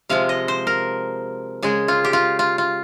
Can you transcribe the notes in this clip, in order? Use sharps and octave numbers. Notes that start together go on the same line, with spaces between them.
C3 F3 G#3 F5
D#5
C5
A#4
C#3 G#3 G#4
F4
G4
F4
F4
F4